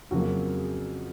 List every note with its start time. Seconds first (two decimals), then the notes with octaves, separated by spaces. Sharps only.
0.11 F2 C#3 F#3 A#3 F#4
0.58 G#4